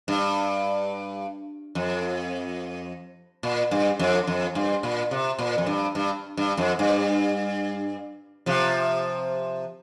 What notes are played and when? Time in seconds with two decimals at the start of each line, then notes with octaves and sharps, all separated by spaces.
0.08 G2
1.75 F2
3.43 A#2
3.71 G2
3.99 F2
4.27 F2
4.55 G2
4.83 A#2
5.11 C3
5.39 A#2
5.58 F2
5.66 G2
5.95 G2
6.37 G2
6.57 F2
6.79 G2
8.46 C3 F3